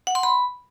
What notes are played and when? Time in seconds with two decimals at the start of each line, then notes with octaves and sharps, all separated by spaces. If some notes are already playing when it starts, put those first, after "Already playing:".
0.07 F#5
0.15 C6
0.23 B5